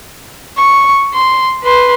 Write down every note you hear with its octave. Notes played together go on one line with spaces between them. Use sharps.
C#6
C6
B4 C6